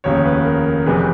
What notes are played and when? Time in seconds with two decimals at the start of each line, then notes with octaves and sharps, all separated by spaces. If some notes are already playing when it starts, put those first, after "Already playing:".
0.04 F1 D#2 C#3 C#5
0.25 B4
0.45 A#4
0.66 A#4
0.86 F1 F2 C3 E3 G#3 B4